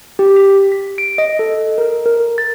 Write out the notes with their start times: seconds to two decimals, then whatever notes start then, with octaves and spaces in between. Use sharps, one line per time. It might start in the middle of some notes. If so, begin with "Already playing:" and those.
0.19 G4
0.36 B6
0.72 B6
0.98 D7
1.18 D#5
1.39 A4
1.78 A#4
2.06 A#4
2.38 A6